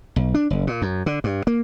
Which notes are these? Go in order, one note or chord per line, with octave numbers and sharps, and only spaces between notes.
B1
D4
F#1
A#2
F#2
D3
G2
A#3